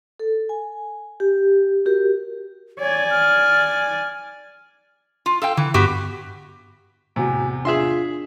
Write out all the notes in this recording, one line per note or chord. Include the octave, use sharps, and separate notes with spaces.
A4
G#5
G4
F#4 G4 A#4
C#5 D5 G#5
F6
F4
A4 F5 G5
D3 E3
G2 B3 F#4 G4
E2 A2 C3 F#4 G#5
D4 F4 G#4 E5 C6